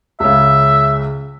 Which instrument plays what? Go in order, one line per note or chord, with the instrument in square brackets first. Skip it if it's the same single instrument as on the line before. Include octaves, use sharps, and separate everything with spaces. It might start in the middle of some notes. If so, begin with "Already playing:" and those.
[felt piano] C#2 C#3 [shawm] E5